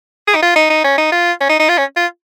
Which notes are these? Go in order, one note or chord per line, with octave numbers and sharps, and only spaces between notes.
G#4
D#4
F4
D#4
D#4
C#4
D#4
F4
C#4
D#4
D#4
F4
C#4
F4